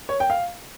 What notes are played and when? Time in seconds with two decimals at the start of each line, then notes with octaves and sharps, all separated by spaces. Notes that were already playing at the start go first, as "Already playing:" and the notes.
0.09 C#5
0.20 G5
0.30 F5